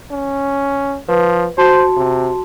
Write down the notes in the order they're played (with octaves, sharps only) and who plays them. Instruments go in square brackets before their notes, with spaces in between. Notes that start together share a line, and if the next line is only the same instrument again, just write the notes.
[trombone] C#4
[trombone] F3 [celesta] B4
[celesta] F#4 A5 C6 [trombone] C5
[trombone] C3